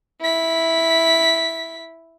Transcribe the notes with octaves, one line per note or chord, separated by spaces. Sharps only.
E4 B6